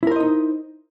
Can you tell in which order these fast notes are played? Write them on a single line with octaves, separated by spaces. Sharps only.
E4 A#4 C5 D#5 D#4